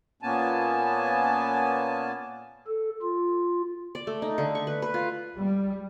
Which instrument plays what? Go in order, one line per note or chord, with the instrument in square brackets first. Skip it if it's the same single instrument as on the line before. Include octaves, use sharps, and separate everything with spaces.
[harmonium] A#2 A#3 B3 C#4 G#5 A5
[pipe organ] A4
F4
[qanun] D5
A3
D#4
D3
C#6
B4
B4
F4
[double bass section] G3